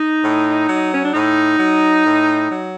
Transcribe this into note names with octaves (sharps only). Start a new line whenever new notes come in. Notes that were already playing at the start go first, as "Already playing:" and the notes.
Already playing: D#4
A2
F#3
C#4
D4
A2 D#4
F#3
A2
F#3